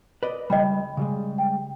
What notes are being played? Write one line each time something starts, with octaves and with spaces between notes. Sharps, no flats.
B4 D5 D#5
C#2 G3 D#5 G5 B5
C#3 G3 G#3
G5